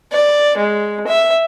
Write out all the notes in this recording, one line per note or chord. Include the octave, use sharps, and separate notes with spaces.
D5
G#3
E5